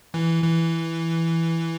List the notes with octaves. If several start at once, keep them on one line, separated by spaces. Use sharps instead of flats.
E3
E3